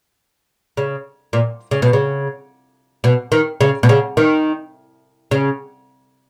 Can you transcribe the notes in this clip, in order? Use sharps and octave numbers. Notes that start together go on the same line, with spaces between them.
C#3
A#2
C#3
B2
C#3
B2
D#3
C#3
B2
C#3
D#3
C#3